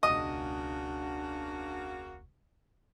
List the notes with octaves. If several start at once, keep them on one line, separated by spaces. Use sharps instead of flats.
E1 C#2 C#3 A#3 D4 F#4 D#5